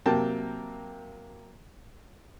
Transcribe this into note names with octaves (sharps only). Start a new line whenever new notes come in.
C3 F#3 A#3 G5 A5